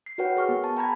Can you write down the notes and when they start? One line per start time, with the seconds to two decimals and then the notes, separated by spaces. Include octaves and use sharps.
0.06 C7
0.18 F#4 A#4 B4 C#5 F#5 G5
0.37 G#4 C#6 F6
0.49 B3
0.64 A5
0.77 G5 A#5 B5 G#6